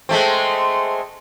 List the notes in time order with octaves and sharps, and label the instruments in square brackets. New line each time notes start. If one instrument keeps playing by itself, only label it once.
[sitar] G#3 A3 C4